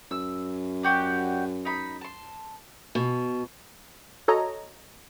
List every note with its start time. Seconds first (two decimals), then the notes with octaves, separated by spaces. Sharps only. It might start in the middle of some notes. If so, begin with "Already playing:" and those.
0.11 F#2 E6
0.83 F#4 G4 D5
1.65 D#4 B5
2.01 A5 C6
2.95 B2
4.28 F#4 A4 C#5 D#5 A#5